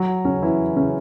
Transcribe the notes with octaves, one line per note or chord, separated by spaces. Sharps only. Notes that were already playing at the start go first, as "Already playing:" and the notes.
Already playing: F#3 F#4
C#3 C#4
E3 E4
C#3 C#4